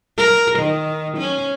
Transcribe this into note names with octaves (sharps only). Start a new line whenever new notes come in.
A#4
D#3
C#4